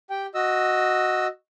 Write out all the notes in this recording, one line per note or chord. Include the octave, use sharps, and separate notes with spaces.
G4 G5
F#4 D#5 E6